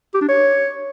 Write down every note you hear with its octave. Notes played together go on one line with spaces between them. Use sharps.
G4
D4
C#5